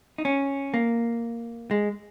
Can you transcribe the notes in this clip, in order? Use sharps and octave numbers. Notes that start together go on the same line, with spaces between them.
D#4
C#4
A#3
G#3